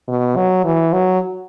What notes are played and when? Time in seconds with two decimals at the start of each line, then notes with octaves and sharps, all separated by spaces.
0.08 B2
0.36 F#3
0.65 E3
0.93 F#3